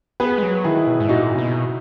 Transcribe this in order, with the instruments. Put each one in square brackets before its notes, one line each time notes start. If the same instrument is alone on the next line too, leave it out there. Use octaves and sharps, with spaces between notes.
[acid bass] B3 [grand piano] G#4 B4
[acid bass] G#3
F#3
[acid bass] D#3 [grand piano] E4 G#4
[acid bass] B2
G#2
[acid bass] A#2 [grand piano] D#4 F#4
[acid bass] C#3
B2